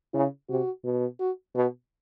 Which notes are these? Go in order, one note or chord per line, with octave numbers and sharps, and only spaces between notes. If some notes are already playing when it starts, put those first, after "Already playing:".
C#3 E4
C3 F#4
B2
F#4
B2 F#4